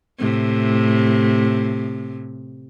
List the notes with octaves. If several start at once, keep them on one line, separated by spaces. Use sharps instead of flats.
A2 C3